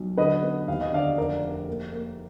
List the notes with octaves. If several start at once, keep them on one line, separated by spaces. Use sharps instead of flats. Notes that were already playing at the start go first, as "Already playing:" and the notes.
Already playing: B1
D3 B4 D#5
B3
D#2 F5
D#5
D3 D5 F5
F1 A#4 D5
F1
A#3
A#3